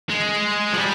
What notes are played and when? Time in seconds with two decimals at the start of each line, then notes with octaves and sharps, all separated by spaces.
0.10 G#3
0.73 F3
0.78 G3